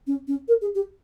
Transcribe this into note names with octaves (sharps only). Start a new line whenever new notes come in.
C#4
C#4
A#4
G#4
G4